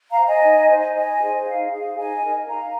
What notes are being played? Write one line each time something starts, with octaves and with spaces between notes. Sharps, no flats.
F5 A#5
C5
D#5 G#5
D#4
C5
D#4 D#5 G#5
G#4 C5
D#4 F5
G#4 C5 F5
D#4 D#5 G#5
A#4
D#4 F5 A#5